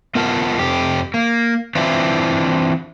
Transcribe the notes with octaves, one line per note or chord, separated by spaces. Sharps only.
B3 F4 A#4 F#5 A5
F2 G4
A#3
E3 C4 D4 E4 F4